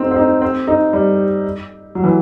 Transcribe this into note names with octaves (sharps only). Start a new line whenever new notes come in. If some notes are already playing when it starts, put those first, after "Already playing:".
Already playing: A3 C4 D#4
C4
D#4
C4
D#4
G3
F#3
E3